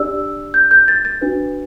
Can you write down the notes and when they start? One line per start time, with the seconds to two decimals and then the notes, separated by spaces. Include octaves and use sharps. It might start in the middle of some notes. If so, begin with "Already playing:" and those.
Already playing: D4 G4 D5 E6
0.54 G6
0.71 G6
0.88 A6
1.05 A6
1.21 D4 F#4 B4